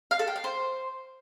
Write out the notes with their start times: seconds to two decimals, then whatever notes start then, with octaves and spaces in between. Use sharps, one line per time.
0.11 F5
0.19 A4
0.28 G5
0.36 F5
0.44 C5